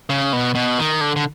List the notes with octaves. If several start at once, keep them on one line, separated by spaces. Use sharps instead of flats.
C#3
B2
B2
D#3
D3
D3